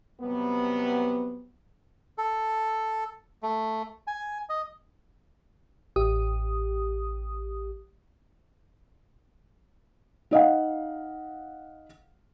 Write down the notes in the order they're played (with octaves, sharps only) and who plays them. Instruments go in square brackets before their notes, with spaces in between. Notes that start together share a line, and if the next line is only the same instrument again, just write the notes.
[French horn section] C3 F#3 G3 B3
[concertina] A4
A3
G#5
D#5
[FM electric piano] A1 G4 D#6
[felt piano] D#4 D#5 F5 F#5